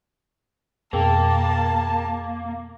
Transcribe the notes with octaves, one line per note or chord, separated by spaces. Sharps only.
F2 B2 A#3 G#4 A#4 G5 A5